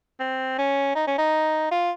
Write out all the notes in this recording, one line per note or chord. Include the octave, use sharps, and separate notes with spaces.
C4
C#4
D#4
C#4
D#4
F4